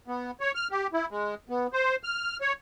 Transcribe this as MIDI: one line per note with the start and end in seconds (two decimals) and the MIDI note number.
0.08 0.31 59
0.41 0.52 73
0.55 0.68 89
0.71 0.87 67
0.93 1.06 64
1.11 1.35 56
1.49 1.67 59
1.73 1.96 72
2.03 2.37 89
2.41 2.53 73